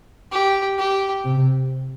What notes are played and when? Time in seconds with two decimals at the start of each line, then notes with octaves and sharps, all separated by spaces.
0.32 G4
0.78 G4
1.25 C3